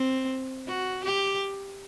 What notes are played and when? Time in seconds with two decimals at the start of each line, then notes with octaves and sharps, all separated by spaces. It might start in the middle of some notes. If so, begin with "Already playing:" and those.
Already playing: C4
0.68 F#4
1.04 G4